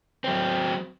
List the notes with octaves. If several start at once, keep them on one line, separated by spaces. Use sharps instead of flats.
F#3 C4